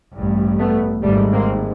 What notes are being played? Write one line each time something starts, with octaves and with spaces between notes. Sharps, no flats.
A1 G2
A3 B3
G#1 G#2 G3 A3
A#3 C4